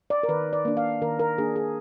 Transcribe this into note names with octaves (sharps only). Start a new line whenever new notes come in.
D5
A#4
D#3 B4
D5
A#3 D4
F5
D#3 A#4
A#4
A#3 D4 G#4
G#4